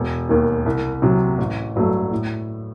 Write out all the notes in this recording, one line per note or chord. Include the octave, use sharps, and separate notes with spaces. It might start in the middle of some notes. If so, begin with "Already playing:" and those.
Already playing: E1
D#2 D#3
C2
C3 F#3
A1
G2 F#3 A3
A2